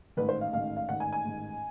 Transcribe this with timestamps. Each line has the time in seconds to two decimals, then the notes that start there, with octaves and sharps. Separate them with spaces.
0.17 A1 G#2 D#3 B4
0.29 C5
0.41 F5
0.52 A1 G#2 D#3 F5
0.77 F5
0.88 A1 G#2 D#3 F#5
1.00 G#5
1.13 G#5
1.24 A1 G#2 D#3